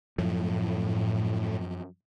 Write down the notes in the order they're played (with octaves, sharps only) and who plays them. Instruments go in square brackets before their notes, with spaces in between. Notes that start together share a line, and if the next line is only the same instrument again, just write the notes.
[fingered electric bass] F#2 F3 [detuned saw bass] A2